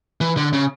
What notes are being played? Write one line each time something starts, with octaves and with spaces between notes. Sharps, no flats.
E3
D3
C#3